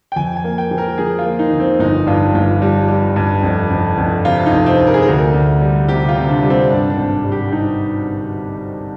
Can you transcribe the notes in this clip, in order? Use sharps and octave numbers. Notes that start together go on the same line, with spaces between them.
G5
F2 G#5
G#5
A#3
G5
F3
A#4
F3 G#4
F4
A#3
D#4
F2
C4
G1 D#4
G2 F4
G1 F4
G3
G3
G2
F1
F1
F1
C3 F4
D#4
F1
C4
F1
A#4
G#4
D2 A#4
D2
G3
C3 G4
F4
C3
D4
G3
C4
G2 D4
D4
G#1
G3
G4
G3 D#4